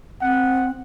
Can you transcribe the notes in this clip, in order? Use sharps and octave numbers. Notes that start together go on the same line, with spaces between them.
C4 F#5